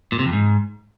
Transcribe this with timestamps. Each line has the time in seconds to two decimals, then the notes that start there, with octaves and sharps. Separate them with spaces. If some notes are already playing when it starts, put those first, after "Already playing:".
0.12 A#2
0.19 C3
0.26 F2
0.33 G#2